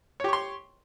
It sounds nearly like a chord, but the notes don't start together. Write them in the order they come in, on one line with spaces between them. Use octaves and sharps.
C#5 G4 C#6 C6